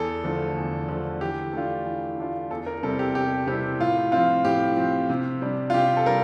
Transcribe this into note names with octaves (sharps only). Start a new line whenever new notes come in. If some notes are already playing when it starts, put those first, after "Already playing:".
Already playing: E2 A4
D3 F3 A3
E2
D3 F3 A3
E3 G4
A3 D4 F4
E3
A3 D4 F4
E2 A4
A#4
C3 G3 C4 E4 A4
G4
E2 G4
C3 G3 C4 E4 G4
A2 F4
F3 C4 F4
A2 G4
F3 C4
C3
G3 D4
F4
C3 G4
A4
G3 A#4